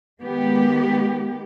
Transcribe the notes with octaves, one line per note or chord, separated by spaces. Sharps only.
D#3 G#3 B3 G4